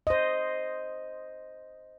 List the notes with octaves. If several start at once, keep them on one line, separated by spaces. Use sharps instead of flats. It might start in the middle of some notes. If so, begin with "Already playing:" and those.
C5 D#5